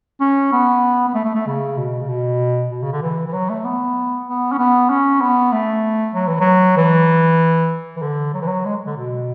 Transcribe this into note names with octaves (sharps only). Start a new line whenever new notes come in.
C#4
B3
B3
A3
A3
A3
C#3
B2
C#3
B2
B2
C#3
D3
E3
E3
F#3
A3
B3
B3
C#4
B3
C#4
B3
A3
F#3
E3
F#3
E3
E3
D3
F#3
E3
F#3
G#3
D3
B2